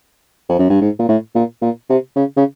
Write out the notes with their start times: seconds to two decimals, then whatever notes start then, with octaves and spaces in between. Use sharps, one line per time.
0.49 F2
0.59 F#2
0.70 G2
0.81 G#2
0.99 A#2
1.09 A2
1.35 A#2
1.61 A#2
1.89 C3
2.16 C#3
2.37 C#3